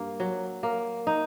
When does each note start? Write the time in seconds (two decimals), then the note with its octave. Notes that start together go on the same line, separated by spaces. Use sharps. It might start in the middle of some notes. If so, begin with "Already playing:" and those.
Already playing: G2 A#3
0.20 F#3
0.63 A#3
1.07 D#4